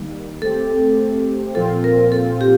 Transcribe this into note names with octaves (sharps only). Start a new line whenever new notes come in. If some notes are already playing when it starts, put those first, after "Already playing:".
Already playing: D#3 G3 A#3
A3 C4 G4 A4
A#2 F3 C4 F4 A4
A#4
A4
G4